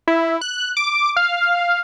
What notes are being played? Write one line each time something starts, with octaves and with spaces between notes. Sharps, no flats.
E4
F#6
D6
F5